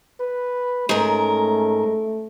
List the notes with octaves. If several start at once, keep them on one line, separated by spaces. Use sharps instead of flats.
B4
G#2 A3 C#4 A#4